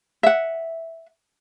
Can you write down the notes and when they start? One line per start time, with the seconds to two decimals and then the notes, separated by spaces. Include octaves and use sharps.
0.23 E5 F#5